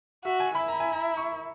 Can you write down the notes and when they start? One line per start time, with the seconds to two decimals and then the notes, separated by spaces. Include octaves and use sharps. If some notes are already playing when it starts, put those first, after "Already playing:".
0.24 F#4 E5
0.40 G#5
0.55 E4 B5
0.68 A#5
0.80 G#5
0.93 A#5
1.17 C#6